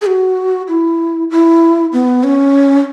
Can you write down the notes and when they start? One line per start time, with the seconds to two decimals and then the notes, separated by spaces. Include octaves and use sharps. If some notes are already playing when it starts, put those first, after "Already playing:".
0.02 G#4
0.06 F#4
0.68 E4
1.30 E4
1.93 B3
2.24 C#4